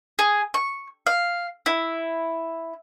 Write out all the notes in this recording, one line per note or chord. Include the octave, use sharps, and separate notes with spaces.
G#4
C#6
F5
E4